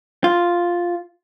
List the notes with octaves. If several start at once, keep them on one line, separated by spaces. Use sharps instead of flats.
F4